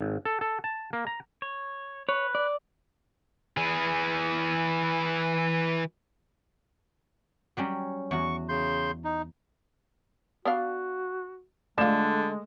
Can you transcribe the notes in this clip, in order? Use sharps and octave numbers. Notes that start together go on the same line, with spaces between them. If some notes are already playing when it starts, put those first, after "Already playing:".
G#1
A4
A4
A5
A#3
A#5
C#5
B4 C#5
D5
E3 G#4
F#3 G3 C#4
E2 F#4 C#6
C#3 C6 G6
D#4
B3 D4 F#4 F5
D3 G#3 A3 D4 F4 E7